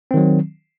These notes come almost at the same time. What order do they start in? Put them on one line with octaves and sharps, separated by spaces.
C4 D#3 F#3